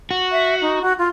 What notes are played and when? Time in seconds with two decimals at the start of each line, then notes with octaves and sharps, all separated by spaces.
0.11 F#4
0.32 E5
0.61 D#4
0.82 F#4
0.98 F4